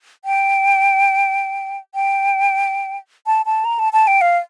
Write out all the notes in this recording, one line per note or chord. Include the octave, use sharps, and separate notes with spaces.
G5
G5
A5
A5
A#5
A5
A5
G5
F5